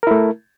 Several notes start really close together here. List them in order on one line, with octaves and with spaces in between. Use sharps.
A#4 E4 A3